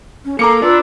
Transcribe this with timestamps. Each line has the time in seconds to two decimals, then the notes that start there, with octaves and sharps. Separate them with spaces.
0.25 C#4
0.39 A#3 A4 A#5 D6 C#7
0.62 D4 F4 B4 E6